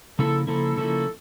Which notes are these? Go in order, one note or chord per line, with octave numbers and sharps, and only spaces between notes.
C#3 F3 A#3 E4 A4
C#3 F3 A#3 E4 A4
C#3 F3 A#3 E4